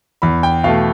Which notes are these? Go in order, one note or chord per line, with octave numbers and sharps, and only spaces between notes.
E2 B5
G5
B2 A3 F5